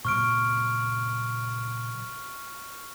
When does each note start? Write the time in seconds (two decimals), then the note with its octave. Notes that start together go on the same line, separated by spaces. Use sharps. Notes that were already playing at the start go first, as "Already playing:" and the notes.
0.05 A#2 C#3 F#3 C#6 F6 D7